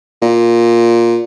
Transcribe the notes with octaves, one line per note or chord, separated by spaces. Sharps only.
A#2